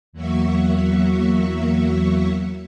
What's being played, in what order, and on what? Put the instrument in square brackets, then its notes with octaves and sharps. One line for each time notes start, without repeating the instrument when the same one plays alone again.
[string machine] E2 F#3 A#3 F#4 E5 C#6